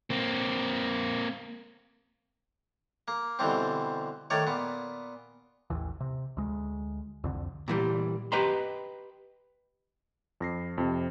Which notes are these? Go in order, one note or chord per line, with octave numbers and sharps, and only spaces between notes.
A#3 C4
A#3
B2 D3 E3 G3 C4
D#3 A3 C#5 D5
A#2 B3
A1 D#2 E3
C3
D2 G#3
C2 F2 D3
A#2 E3 G3
G4 B4 D#5 A#5 C6
F2 A#6 C7
F2 C3